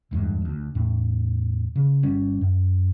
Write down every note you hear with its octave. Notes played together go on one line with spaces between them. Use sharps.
D1 E2 G2 G#3
D2
E2 A2
C#3
G1 G3 C#4
F#2